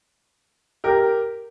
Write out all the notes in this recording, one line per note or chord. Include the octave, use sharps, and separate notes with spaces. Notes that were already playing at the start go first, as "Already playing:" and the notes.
G4 A#4